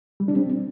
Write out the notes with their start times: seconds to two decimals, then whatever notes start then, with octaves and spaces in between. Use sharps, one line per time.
0.20 G3
0.28 D4
0.36 C4